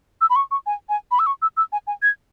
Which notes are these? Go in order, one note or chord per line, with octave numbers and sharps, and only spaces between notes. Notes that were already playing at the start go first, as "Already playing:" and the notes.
E6
B5
C#6
C#6
G#5
G#5
B5
E6
C#6
E6
E6
G#5
G#5
G#6